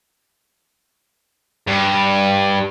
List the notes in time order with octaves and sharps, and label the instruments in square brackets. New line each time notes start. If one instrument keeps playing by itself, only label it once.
[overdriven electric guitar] G2